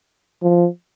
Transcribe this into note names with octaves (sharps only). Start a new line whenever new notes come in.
F3